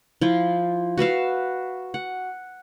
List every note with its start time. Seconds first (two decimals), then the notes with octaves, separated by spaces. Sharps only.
0.21 F3 E4 F4
0.98 F#4 B4 E5 F5
1.94 F#5